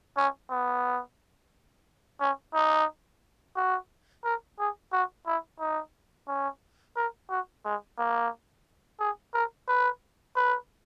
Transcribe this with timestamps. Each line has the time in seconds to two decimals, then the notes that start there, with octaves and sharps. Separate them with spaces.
0.17 C#4
0.50 B3
2.21 C#4
2.54 D#4
3.56 F#4
4.24 A#4
4.59 G#4
4.92 F#4
5.27 E4
5.60 D#4
6.28 C#4
6.96 A#4
7.30 F#4
7.65 G#3
7.98 A#3
9.00 G#4
9.34 A#4
9.68 B4
10.36 B4